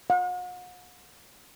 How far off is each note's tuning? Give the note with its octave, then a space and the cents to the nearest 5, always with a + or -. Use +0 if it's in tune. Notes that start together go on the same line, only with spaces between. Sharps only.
F#5 -40